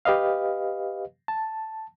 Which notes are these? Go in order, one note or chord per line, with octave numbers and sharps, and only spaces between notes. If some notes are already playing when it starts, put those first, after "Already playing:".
G4 B4 D#5 F5
A5